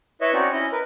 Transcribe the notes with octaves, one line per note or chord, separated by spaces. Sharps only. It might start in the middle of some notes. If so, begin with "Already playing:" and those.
E4 B4 C#5 D#5 E5
C4 C#4 D#4 F#4 C#5 D5
C#4 E4 D#5
A#4 B4